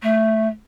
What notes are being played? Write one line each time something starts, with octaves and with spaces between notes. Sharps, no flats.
A3